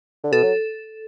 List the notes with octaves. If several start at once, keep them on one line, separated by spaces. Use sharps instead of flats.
D3
B2 A4
F#3